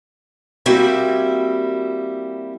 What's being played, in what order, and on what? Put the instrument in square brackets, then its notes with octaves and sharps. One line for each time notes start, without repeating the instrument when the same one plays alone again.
[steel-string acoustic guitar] G3 A#3 C4 E4 F#4 E5